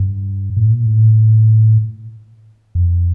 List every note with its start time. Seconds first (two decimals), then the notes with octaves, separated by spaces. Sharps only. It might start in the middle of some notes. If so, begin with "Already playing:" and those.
Already playing: G2
0.57 A2
0.71 A#2
0.86 A2
2.75 F2